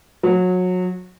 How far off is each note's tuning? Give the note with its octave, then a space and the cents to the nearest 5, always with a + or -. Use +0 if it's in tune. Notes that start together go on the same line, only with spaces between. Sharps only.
F#3 -25